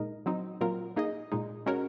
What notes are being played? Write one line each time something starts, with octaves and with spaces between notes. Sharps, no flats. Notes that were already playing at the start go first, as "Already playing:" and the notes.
Already playing: A#2 G#3 D#4 A#4 D#5
F#3 C4 D#4
A#2 F#3 C4 F4 A#4
A#3 D#4 G#4 D#5
A#2 G#3 D#4
G#3 C#4 F#4 A#4 C#5